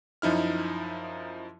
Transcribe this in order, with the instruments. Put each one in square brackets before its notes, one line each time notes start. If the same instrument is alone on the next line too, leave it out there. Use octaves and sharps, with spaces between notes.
[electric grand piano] F#2 F3 D#4 E4 F6